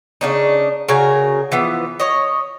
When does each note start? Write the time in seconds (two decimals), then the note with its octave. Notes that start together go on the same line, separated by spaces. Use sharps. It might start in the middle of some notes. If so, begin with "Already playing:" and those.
0.21 C#3 D4 D#4
0.89 C#3 F#4 A#4 G#5
1.52 E3 F3 B3
2.00 C#5 D#5